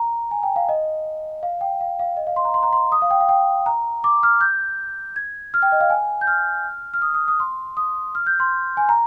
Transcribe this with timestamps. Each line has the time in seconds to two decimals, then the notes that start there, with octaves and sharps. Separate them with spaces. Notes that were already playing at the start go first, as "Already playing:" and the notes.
Already playing: A#5
0.31 G#5
0.43 G5
0.56 F5
0.69 D#5
1.43 F5
1.61 G5
1.81 F5
1.99 F5
2.17 D#5
2.27 F5
2.36 C6
2.45 A#5
2.54 C6
2.63 A#5
2.73 C6
2.92 D#6
3.02 F5
3.11 G5
3.20 F5
3.29 G5
3.66 A#5
4.04 D6
4.23 F6
4.41 G6
5.16 G#6
5.54 F6
5.62 G5
5.72 D#5
5.81 F5
5.90 G#5
6.21 G6
6.27 F6
6.94 F6
7.02 D#6
7.14 D#6
7.28 D#6
7.40 C6
7.77 D#6
8.15 F6
8.27 G6
8.40 C6
8.77 G#5
8.89 A#5